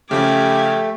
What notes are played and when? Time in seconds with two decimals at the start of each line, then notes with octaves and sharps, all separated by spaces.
0.11 C#3 F3 A3 C#4 G4 D6 G#6